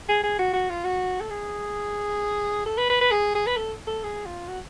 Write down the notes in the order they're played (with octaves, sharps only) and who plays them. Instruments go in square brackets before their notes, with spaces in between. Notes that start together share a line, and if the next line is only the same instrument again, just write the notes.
[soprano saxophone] G#4
G#4
F#4
F#4
F4
F#4
A4
G#4
A4
B4
B4
B4
G#4
G#4
B4
A4
A4
G#4
F4
F#4